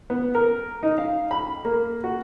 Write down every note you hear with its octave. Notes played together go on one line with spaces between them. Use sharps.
B3
A#4
D#4
F5
B5
A#3
F#4